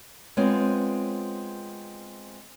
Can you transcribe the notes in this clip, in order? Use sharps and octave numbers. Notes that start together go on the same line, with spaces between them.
G#3 B3 C4 F4 C#5